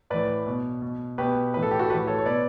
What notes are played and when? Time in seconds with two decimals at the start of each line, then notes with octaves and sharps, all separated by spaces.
0.10 A2 E3 B4 D5
0.46 B2
0.82 B2
1.18 B2 G4 B4
1.54 A2 E3 B4
1.63 A4
1.71 G4
1.79 F#4 A4
1.90 A2 G4 B4
1.94 E3
2.07 A4 C#5
2.18 C#5
2.25 B2 B4 D5